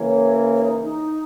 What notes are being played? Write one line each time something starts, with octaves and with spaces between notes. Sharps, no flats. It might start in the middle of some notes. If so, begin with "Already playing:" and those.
Already playing: C#3 E3 A#3 C#5
C#5
D#4
D#4